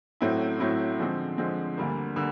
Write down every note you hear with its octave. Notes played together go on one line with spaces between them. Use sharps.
A2 F#3 A3 C4 E4
A2 F#3 A3 C4 E4
D3 F3 G#3 C4
D3 F3 G#3 C4
D2 D3 G3 A#3
D3 G3 A#3